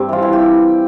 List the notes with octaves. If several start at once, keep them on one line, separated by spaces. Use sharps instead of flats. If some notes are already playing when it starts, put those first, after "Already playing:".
Already playing: G2 C4 G4
E3 F4
E3
G4